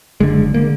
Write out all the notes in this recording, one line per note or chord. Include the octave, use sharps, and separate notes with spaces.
F#1 F#2 D3 G#3
D3 A#3